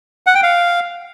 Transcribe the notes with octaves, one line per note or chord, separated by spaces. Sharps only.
F#5
G5
F5